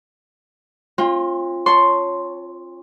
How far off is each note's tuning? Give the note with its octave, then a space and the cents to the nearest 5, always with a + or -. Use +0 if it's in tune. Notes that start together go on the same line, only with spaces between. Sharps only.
C4 +45 F4 +0
C#5 +0 A5 +0 C6 +0